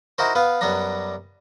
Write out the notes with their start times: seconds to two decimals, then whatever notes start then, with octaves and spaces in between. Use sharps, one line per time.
0.18 D#4 E4 F#4 A#4 C5
0.35 B3 B4 F5
0.61 F#2 G3 B3 D4 A#5